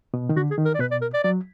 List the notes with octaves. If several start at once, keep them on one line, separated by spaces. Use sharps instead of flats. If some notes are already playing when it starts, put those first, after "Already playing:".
B2
D#3
D3 F#4
G#4
D#3
A#4
D5
B2 B4
D5
A#4
D5
F#3 D5